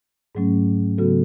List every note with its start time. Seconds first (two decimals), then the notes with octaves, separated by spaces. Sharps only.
0.35 G#2 F#3 A3 C#4
0.98 C#3 F#3 B3 F#4 A4